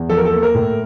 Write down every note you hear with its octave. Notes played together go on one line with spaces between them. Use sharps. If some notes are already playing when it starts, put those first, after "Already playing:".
Already playing: E2
F3 A4
A#4
A4
A#3
A#4
A2